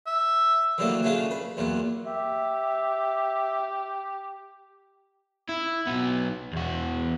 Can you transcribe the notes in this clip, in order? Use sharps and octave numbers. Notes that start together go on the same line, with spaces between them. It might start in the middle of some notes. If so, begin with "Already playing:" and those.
E5
D3 E3 F#3 G3 A3 A#3
F#3 A3 C#4 D4 F4 G#4
B4
E2 A#2 F#3
G4 E5
E4
B1 B3
E2 F#4